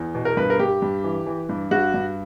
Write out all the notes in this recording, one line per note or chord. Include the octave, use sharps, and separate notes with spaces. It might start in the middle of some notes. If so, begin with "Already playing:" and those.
Already playing: E2
B2
A#4
G2 B4
A#4
G2 G4
G2
E3
E3
G2
G2 F#4
G2